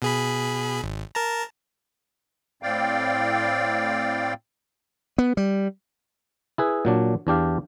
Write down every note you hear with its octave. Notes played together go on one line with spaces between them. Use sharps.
B2 G#4 B5
G#1
A#4 A5 A#5
A2 C4 D5 F5 G5
B3
G3
E4 G#4 B4
A#2 F#3 D4
E2 D4 G4 F5